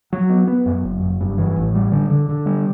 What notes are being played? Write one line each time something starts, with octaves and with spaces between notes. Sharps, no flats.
F#3
B3
B3
F#2
F#1
F#1
G2
E3
A1
G3
D3
D3
D3
G3